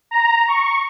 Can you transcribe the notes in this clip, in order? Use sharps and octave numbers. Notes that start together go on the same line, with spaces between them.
A#5
C#6